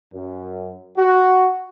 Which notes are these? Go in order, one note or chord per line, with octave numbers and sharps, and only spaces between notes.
F#2
F#4